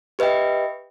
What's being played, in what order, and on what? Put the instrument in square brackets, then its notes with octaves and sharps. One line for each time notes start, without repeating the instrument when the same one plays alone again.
[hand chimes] G4 B4 D#5 E5 G5